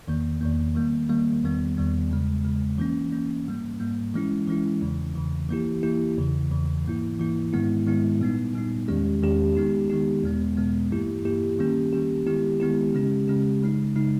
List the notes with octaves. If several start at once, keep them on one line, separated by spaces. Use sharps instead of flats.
E2 D#3 A#3
E2 D#3 A#3
D#3 G3 A#3
D#3 G3 A#3
E2 D#3 G3 B3
E2 D#3 G3 B3
E2 C#3 G#3
E2 C#3 G#3
E3 A#3 C#4
E3 A#3 C#4
G#2 G3 A#3
G#2 G3 A#3
E3 G#3 C#4 E4
E3 G#3 C#4 E4
E2 C#3 E3
E2 C#3 E3
E3 A#3 E4 G4
E3 A#3 E4 G4
E2 C#3 E3
E2 C#3 E3
G#2 E3 A#3 E4
G#2 E3 A#3 E4
G#2 D#3 G#3 B3 E4
G#2 D#3 G#3 B3 E4
A#2 G3 B3 D#4
A#2 G3 B3 D#4
E2 D#3 G#3 C#4 G4
E2 D#3 G#3 C#4 G4
D#3 G#3 B3 D#4 G4
D#3 G#3 B3 D#4 G4
E2 B2 G#3 B3
E2 B2 G#3 B3
G2 E3 A#3 E4 G4
G2 E3 A#3 E4 G4
D#3 G3 A#3 C#4 G4
D#3 G3 A#3 C#4 G4
D#3 G#3 B3 E4 G4
D#3 G#3 B3 E4 G4
C#3 G#3 C#4 G4
C#3 G#3 C#4 G4
C#3 G#3 D#4
C#3 G#3 D#4